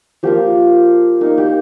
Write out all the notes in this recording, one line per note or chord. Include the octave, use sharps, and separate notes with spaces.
F3 A#3 F4 G4
A#3 D#4
G4